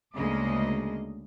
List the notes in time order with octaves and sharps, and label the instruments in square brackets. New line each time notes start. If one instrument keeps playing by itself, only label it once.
[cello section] D2 C#3 G#3 A#3 D#5